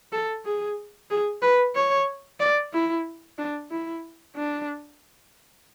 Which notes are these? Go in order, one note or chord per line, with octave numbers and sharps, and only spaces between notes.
A4
G#4
G#4
B4
C#5
D5
E4
D4
E4
D4